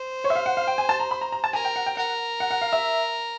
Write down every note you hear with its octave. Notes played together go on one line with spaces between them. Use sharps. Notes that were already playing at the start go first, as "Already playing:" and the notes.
Already playing: C5
C#5
E5
F5
F#5
F5
G5
G#5
A5
A#5
B5
A#5
A#5
A5
A#4 G#5
G5
F#5
G5
A#4 F#5
F#5
F#5
F5
E5